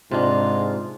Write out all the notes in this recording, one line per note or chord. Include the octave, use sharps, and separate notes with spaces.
G#2 C3 D4 F4